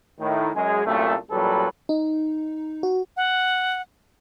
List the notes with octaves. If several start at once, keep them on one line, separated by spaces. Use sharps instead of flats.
A2 D#3
F#2 G#3 G#4
C2 F#2 A#2 A3
A1 A#2 F#3 G3 A4 B4
D#4
F#4
F#5